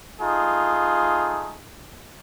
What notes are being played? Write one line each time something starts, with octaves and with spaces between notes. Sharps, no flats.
A3 D#4 F4 G#4